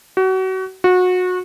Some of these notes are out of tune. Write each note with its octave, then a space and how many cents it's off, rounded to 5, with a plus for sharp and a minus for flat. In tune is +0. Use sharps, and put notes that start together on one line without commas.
F#4 +30
F#4 -25